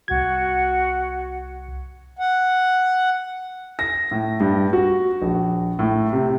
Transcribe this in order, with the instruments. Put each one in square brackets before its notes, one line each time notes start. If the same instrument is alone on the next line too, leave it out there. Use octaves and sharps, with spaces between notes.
[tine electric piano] C2 G#6 [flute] F#4
[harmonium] F#5
[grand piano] A#6
A2
G2
F#4
A#1
A2
C3